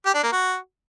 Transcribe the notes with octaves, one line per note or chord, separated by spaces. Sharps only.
G4
D4
A#3
F#4